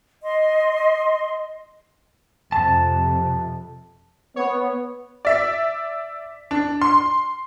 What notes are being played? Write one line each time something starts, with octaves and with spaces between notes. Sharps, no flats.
D#5 C6
F2 C3 A5
B3 C#5
D5 E5
D4
C6